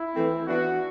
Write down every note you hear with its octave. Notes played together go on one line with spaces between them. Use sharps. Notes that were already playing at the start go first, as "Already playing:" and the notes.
Already playing: E4
E3 A3 C4
E3 B3 D4 F#4